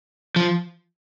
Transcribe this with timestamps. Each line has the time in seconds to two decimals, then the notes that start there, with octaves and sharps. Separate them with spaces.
0.36 F3